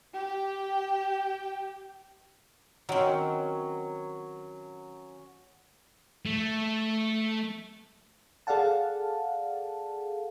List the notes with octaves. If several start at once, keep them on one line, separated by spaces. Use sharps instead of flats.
G4 G5
D#3 F#3 C4 C#4
A3
G#4 A4 D5 F5 F#5 A5